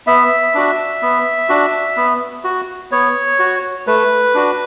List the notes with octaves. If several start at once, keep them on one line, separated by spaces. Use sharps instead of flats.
B3 E5
D4 F#4
B3
D4 F#4
B3
F#4
B3 C#5
F#4
A3 B4
D4 F#4